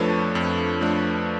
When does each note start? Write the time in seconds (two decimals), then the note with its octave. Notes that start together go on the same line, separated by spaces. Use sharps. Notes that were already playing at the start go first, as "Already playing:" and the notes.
Already playing: F2 F3 A3 D4 A4 B4 C#5
0.35 F2
0.81 F3 A3 D4